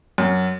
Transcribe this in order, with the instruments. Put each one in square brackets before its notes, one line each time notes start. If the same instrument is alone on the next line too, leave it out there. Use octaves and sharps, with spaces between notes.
[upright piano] F#2